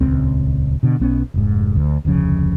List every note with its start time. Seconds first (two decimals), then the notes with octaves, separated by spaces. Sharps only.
0.01 D#1 C#2 C4
0.83 B2 D3
1.00 B1 B3 C#4
1.34 F1 G#2
1.76 D2
2.05 F1 D2 C#3 F3